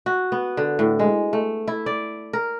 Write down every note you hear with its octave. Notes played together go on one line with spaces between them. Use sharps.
F#4
B3
D3
A2
G#3
A3
E4
D5
A#4